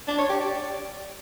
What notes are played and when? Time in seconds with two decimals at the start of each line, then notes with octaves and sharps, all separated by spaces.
0.08 D4
0.18 C#5
0.29 G4
0.40 D5